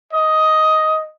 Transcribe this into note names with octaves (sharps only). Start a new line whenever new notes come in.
D#5